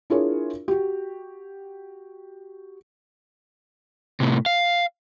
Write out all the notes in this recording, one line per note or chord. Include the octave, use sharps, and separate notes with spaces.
D4 E4 F4 G#4 A#4 C#5
F#4 G4
A2 C3
F5